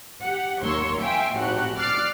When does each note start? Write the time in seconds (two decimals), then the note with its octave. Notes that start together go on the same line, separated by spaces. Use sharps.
0.24 G4 F#5
0.63 D#2 A#4 C#5 C6 E6
1.01 E5 F5 G5 G#5 C6
1.37 G#1 A2 F#4 G4 F#6
1.79 D5 D6 F6 F#6 A6 C7